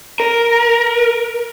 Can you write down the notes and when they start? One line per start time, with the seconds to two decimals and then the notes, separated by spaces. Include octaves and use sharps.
0.20 A#4